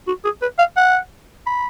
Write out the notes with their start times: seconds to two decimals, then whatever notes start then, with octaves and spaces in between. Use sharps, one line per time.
0.07 F#4
0.25 G#4
0.42 B4
0.58 F5
0.77 F#5
1.46 B5